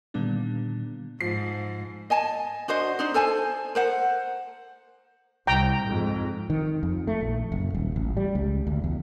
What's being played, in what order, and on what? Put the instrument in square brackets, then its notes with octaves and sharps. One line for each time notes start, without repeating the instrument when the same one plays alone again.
[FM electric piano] A#2 D3 D#3 G3 B3 D4
[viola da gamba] G#2 [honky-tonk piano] F3 C7
[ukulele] D#5 G#5 A5
D4 F#4 C5 D#5
D4 D#4 C5
A4 C5 G#5 A5
A#4 C5 F#5
[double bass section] C2 [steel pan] G5 A#5
[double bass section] F2 G#2
[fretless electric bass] D#3
F2
A3
A#1
F#1
D#1
A1
G3
C#2
D2
E2